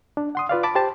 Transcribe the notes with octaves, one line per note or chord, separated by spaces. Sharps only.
D4
F#5 C6 D#6
F4 B4 D5 F5
A5 B5 D6
G4 C5 A5